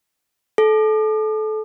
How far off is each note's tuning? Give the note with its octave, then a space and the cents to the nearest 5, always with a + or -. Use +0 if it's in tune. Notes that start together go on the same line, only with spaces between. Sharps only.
A4 -25